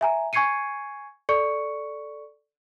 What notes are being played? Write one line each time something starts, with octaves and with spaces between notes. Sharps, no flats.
E5 G#5 A#5
G#5 C#6 G#6 C7 C#7 D#7
A4 D5 C#6 C#7